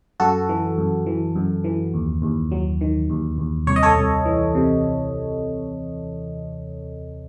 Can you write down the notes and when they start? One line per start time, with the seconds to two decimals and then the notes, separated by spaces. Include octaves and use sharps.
0.20 F#2 F#4 A4
0.49 E3
0.78 F#2
1.06 E3
1.35 F#2
1.64 E3
1.94 D#2
2.22 D#2
2.51 F#3
2.81 D#3
3.10 D#2
3.38 D#2
3.67 C2 C#5
3.76 D#5
3.83 A4 C#5
3.97 C2
4.26 E3
4.55 C3